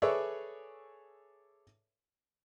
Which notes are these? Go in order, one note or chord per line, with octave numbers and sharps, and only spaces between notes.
G#4 A4 B4 C#5 D5 E5